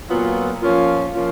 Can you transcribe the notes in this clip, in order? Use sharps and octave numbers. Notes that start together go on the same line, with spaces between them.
A#2 F#3 B3 F4
F3 A#3 C#4 F4
F3 A#3 C#4 F4